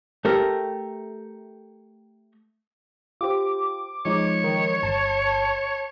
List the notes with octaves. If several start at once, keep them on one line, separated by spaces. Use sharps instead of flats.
A3 G4 A#4
F4 G4 C5 D6
F3 G#3 D#4 C#5
D#3
G1 A5